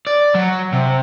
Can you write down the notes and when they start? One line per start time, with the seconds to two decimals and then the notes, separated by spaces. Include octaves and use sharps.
0.07 D5
0.35 F#3
0.73 C3